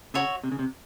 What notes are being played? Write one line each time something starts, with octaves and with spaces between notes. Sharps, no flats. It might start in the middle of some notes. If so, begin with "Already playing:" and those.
C#3 F#4 C#5 E5
C3
C#3
C3